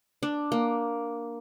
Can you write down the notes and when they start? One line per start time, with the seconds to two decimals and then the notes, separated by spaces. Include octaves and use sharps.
0.23 D4
0.52 A#3